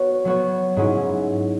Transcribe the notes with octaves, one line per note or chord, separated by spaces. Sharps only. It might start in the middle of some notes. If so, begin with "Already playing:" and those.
Already playing: B3 F#4 C#5
F#3 B3 F#4 C#5
G#2 F#3 C#4 E4